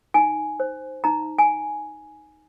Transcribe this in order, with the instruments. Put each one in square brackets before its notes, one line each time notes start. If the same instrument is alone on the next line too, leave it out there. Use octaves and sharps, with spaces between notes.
[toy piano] D#4 G#5
C5
D#4 A#5
G#5